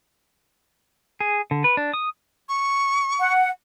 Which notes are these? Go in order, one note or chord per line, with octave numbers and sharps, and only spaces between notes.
G#4
D3
B4
D4
D#6
C#6
F#5